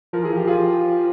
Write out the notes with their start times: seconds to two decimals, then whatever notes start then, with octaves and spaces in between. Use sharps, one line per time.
0.13 F3 A#4
0.23 E3 G#4
0.33 F3 G4
0.47 F4 G#4